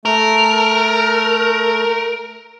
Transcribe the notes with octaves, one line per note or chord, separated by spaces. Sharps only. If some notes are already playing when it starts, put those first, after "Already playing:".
A3 A#4